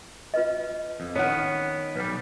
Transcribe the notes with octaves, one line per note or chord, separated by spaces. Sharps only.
F4 B4 D#5
F2
D#3 B3 C#4 F#5
B1 G3 B4